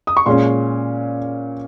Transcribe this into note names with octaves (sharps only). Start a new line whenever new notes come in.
D#6
C#6
A#2 G#3 C#4 C6